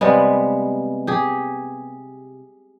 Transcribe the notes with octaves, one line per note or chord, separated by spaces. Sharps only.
C3 G3 G#3 B3
G4 G#4